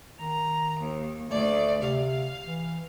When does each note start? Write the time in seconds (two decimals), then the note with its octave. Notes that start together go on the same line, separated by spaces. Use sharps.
0.18 D#3 A#5
0.79 D#2
1.30 D2 A3 D5
1.82 C3 F5
2.45 E3